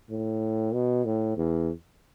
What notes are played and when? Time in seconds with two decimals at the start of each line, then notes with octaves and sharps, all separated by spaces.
0.10 A2
0.74 B2
1.05 A2
1.37 E2